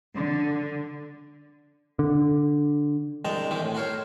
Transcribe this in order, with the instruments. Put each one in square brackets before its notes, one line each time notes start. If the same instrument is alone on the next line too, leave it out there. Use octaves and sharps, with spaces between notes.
[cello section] D3
[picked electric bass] D3
[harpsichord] C2 B2 G#3 G5 A5 A#5
D#3 E3 C4 G4
A2
F#4 A4 A#4 C5 C#5